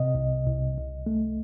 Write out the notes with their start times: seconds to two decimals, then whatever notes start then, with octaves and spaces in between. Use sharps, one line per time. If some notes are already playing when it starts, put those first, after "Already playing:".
Already playing: C3 D#5
0.15 C2
0.46 C2
0.77 C2
1.06 A3